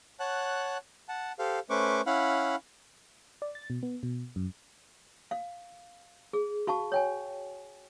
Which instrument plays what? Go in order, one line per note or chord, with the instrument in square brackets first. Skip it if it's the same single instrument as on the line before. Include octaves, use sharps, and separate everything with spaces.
[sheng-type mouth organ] C#5 F#5 A5 F#6
F#5 A5
G4 A4 C5 F5
A3 C#4 B4 C5 C#6 D6
C#4 E4 F5 F#5 B5
[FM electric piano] D5
A6
B2
B3
B2
F#2
[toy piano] F5
G#4
F#4 F5 A5 C#6
C#5 G5 G#5